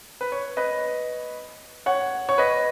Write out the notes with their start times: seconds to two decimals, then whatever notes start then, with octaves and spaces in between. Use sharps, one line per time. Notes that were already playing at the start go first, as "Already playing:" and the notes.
0.21 B4
0.32 C#5
0.57 B4 D#5
1.86 C#5 F#5
2.29 C#5
2.38 B4 D#5